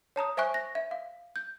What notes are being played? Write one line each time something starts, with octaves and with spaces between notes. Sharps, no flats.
C#5 A5 A#5 D#6
C5 E5 G#5 C#6 F#6
A#6
E5
F5
G6